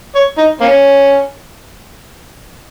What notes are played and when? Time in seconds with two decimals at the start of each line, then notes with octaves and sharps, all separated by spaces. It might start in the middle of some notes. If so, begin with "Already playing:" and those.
0.15 C#5
0.38 D#4
0.61 A#3 C#4